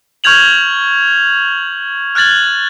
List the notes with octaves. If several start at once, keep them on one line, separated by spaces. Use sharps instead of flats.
C#6 F6 G6 G#6 F7 F#7
F6 F#6 G#6 A6 F#7